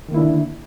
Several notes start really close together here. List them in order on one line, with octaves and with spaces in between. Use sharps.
D#3 A#3 E4 D4 D3